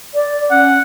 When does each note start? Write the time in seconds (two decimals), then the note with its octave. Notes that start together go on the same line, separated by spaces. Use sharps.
0.15 D5
0.51 C#4 F#5